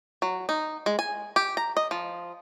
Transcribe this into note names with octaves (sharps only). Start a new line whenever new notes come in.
F#3
D#4
G#3
G#5
G4
A#5
D#5
F3